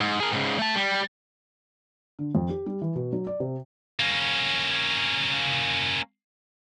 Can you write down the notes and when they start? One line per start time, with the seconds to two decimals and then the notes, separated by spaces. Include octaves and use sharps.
0.01 G#2
0.20 G#4 A#4
0.33 G#2 C#3
0.59 A3 A5
0.75 G3
2.19 D3
2.35 F2
2.49 G4
2.66 G3
2.81 E3
2.95 B2
3.12 F#3
3.27 D5
3.40 C3
4.00 A#3 C#4